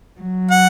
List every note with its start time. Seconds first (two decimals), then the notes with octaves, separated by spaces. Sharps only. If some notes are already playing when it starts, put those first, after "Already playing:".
0.21 F#3
0.51 F#5